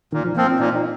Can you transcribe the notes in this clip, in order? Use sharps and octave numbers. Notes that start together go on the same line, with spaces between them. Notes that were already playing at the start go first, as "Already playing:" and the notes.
A#2 D#3
F3
F3 A#3 C4
C4
A#2 D#4
D#4